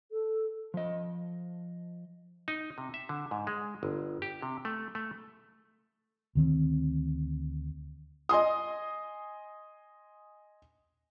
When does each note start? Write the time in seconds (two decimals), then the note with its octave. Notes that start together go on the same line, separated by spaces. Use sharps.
0.12 A4
0.74 F3 D#5
2.48 D#4
2.78 C3
2.94 E5
3.09 D3
3.31 G#2
3.47 G#3
3.83 G1
4.22 G4
4.42 C3
4.65 A3
4.95 A3
6.35 D2 D#3 C4
8.29 D#5 G#5 C6 D#6